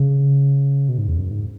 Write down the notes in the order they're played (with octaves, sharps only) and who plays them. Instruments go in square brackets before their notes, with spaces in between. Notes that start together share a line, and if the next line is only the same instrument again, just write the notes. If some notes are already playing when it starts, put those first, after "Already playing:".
Already playing: [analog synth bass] C#3
B2
G#2
E2
F#2
G#2